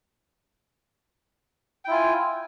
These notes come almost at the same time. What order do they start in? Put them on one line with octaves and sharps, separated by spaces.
G5 E4 F4 G#5